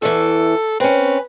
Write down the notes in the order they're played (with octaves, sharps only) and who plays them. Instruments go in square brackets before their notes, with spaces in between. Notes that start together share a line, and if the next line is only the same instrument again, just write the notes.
[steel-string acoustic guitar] E2 E3 [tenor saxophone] A4
[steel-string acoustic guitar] C4 C#4 [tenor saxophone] B4